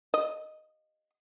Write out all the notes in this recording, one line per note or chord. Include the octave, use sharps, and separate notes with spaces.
D#5